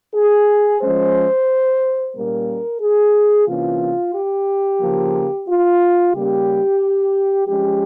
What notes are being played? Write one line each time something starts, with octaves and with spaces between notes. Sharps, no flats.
G#4
F3 G#3 C#4 C5
A#2 G3 A#3 C#4 A#4
G#4
C3 E3 A#3 C#4 F4
G4
C#3 F3 A#3
F4
C#3 G3 A#3 C#4 G4
F3 G#3 C#4 G4